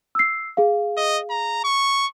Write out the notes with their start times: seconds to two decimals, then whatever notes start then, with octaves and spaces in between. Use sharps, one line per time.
0.15 E6 C7
0.57 G#4 F5
0.97 D#5
1.30 A#5
1.64 C#6